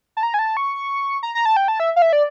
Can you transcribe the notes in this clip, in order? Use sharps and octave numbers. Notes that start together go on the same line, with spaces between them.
A5
A#5
G#5
A5
C#6
A#5
A#5
A5
G5
A5
E5
F5
E5
D5